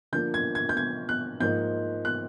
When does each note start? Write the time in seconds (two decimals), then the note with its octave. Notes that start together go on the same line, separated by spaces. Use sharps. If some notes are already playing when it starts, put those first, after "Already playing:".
0.12 D3 F3 A#3 D4 G6
0.34 G#6
0.55 G#6
0.69 G6
0.77 G#6
1.09 F#6
1.40 G#2 F3 A#3 D#4 G6
2.05 F#6